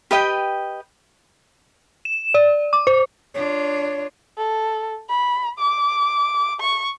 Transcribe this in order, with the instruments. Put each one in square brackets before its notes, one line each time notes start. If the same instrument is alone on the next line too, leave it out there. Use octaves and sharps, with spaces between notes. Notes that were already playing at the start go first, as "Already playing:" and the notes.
[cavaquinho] G4 B4 D#5 G5
[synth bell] E7
D5
D6
C5
[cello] D4 F4 [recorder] C#5
[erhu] A4
B5
D6
C#6